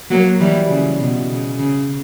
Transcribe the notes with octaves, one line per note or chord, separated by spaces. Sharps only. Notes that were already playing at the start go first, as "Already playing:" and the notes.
F#3 A#3
E3 G3
C#3
B2
C#3
C#3